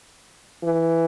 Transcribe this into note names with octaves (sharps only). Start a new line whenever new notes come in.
E3